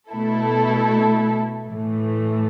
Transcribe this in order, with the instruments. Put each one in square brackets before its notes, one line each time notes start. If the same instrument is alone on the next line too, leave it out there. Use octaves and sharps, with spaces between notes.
[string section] B2 A3 E4 A4
A2 E3 A3